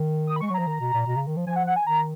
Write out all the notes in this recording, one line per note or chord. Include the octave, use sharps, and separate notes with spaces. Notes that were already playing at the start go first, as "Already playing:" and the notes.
Already playing: D#3
D#6
B5
G#3 C#6
F#3
F3 A#5
D#3
B2
A#2
B2
C#3
D#3
F3
F3 G#5
F#5
F#5
G#5
D#3 A#5